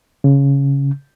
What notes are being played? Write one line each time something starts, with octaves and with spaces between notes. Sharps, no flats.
C#3